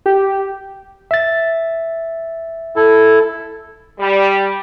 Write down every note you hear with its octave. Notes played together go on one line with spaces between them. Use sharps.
G4
E5 A6
E4 A4
G3